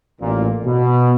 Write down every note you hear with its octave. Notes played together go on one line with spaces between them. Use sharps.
A1 A#2
B2